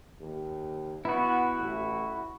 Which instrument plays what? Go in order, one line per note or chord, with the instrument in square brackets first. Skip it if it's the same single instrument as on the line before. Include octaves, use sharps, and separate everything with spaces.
[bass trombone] D#2
[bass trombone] B3 [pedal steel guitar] E4 F#4
[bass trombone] A1